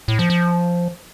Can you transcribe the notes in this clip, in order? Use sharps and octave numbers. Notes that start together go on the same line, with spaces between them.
A2
F3
F3